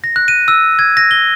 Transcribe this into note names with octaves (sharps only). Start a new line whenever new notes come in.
A#6
F#6
D#7
E6
G#6
A#6
G7